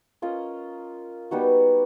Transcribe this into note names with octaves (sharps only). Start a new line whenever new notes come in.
C#4 F4 A#4 D#5
G3 B3 D#4 F#4